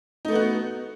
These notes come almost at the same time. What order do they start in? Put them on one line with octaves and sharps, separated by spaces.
D#4 A3 B3 F#4